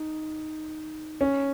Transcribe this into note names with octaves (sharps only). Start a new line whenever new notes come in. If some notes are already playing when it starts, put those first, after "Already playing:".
Already playing: D#4
C#4